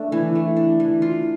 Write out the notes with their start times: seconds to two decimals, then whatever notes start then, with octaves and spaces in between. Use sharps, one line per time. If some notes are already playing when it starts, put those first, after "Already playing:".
Already playing: A3 D4
0.12 E3
0.35 A3
0.56 D4
0.80 E3
1.02 F4